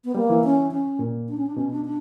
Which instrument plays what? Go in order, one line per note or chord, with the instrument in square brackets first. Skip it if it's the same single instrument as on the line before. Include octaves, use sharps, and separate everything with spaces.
[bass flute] B3
[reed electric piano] G3 [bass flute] A#3
[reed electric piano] E3
[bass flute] C#4
C#4
[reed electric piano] A#2
[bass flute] D4
C#4
D4
[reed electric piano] B2 [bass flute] C#4
[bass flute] D4
D4